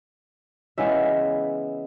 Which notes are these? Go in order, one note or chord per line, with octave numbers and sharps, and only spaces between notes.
C#3 E3 G#3 B3 E5